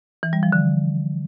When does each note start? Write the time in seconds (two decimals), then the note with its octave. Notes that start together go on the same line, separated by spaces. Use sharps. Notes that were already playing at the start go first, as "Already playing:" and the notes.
0.23 E3
0.33 G3
0.43 F3
0.52 D3